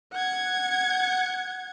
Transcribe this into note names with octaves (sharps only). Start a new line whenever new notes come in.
F#5 G#6